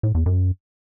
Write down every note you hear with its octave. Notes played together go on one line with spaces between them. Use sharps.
A2
E2
F#2